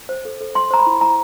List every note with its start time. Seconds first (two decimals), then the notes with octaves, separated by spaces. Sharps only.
0.09 C5
0.25 A4
0.41 A4
0.55 C5 C6
0.71 C5 A#5
0.79 B5
0.86 E4
1.01 E4 A#5